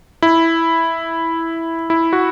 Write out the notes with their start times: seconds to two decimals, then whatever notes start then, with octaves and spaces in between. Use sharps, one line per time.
0.22 E4
1.90 E4
2.13 F#4